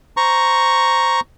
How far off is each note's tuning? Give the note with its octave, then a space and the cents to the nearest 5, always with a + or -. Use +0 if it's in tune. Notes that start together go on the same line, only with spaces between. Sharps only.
C5 -10 A#5 +0 C#6 +0